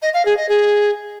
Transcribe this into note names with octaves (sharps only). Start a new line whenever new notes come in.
D#5
F5
G#4
D#5
G#4